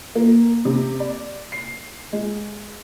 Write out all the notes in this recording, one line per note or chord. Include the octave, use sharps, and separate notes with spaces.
A#3
C3
D5
C7
G#3